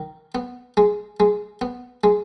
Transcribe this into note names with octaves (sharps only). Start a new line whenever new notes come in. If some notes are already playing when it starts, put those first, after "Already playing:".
Already playing: D#3
B3
G#3
G#3
B3
G#3